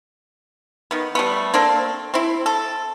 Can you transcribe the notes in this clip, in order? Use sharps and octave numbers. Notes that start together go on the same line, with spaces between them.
D#3 B3
G3 A3 B3
A#3 C4 D4 A4
C4 E4
A4